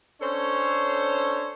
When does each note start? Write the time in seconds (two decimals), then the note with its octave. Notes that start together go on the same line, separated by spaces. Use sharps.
0.21 C#4 D4 A4 C5 C#5